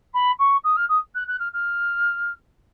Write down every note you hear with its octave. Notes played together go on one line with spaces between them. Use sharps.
B5
C#6
D#6
F6
D#6
F#6
F#6
F6
F6